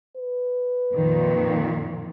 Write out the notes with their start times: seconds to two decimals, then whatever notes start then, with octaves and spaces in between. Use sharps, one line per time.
0.17 B4
0.94 F2 A#2 D#3